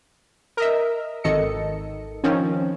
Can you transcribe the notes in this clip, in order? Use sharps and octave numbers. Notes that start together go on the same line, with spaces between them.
A#4 D#5 E5
G#1 D#3 A4 D#5 C#7
D#3 F3 C4 C#4